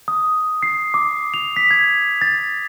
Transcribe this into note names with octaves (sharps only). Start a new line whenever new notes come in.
D#6
C7
D6
F7
B6
G#6
A6